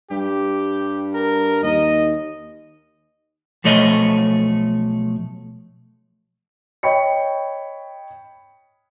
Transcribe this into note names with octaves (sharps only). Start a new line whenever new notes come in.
G2 G4
A#4
D#2 D#5
B1 F3 A3 C#5 D#5
C#5 D#5 G5 B5 C#6 C#7